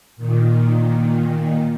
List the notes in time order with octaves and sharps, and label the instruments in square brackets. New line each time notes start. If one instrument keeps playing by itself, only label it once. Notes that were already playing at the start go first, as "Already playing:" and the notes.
[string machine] A#2 D#3